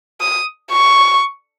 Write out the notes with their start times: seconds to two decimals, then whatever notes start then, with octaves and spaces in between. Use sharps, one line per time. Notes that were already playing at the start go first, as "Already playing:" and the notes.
0.21 D#6
0.71 C#6